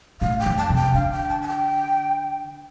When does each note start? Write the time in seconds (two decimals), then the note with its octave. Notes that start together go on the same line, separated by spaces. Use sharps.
0.21 A2 F5
0.40 G5
0.46 F2
0.57 A5
0.70 C3
0.76 G5
0.94 D3 F5
1.12 G5
1.29 A5
1.42 A5
1.48 G5